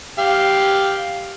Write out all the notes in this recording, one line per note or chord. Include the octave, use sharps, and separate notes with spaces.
G4 F5